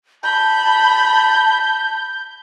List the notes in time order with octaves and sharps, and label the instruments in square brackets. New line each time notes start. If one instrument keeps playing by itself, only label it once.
[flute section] A5 [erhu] B5 [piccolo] G6